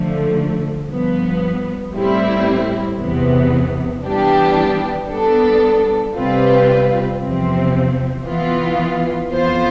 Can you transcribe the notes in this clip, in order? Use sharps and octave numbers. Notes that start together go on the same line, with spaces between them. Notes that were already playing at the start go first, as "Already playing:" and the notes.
Already playing: D2 D3 F3 A3
G2 F3 B3
A2 G3 C4 E4
E2 C3 E3 B3
E3 G3 B3 D4 G4
G3 B3 D4 A4
C3 G3 C4 F4 B4
E2 C3 F3 C4
E3 B3 F4
F2 E3 B3 F4 C5